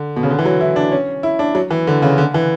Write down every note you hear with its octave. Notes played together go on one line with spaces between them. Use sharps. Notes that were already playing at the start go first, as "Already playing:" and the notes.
Already playing: D3
B2
C#3
D3
E3
F#3
E4
D4
C#4
E4
D4
F#3
E3
D3
C#3
D3
E3